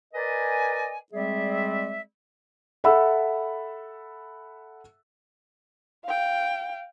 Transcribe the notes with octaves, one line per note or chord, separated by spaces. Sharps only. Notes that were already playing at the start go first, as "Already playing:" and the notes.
A#4 B4 D5 D#5 G#5
G3 G#3 C4 G#4 D5 E5
A4 E5 F#5 B5 E6
F5 G5